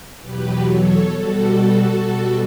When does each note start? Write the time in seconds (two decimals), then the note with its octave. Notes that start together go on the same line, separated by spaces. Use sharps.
0.21 E2 B2 F#3 G4 B4
0.67 A4 C#5
1.12 B2 G3 F#4 A4
2.02 B2 G3